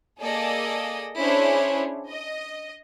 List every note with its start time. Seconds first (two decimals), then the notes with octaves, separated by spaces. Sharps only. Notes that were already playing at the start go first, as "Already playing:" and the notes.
0.20 A#3 G#4 A4 D5 D#5
1.19 C#4 D4 E4 G#4 C5 C#5
2.09 D#5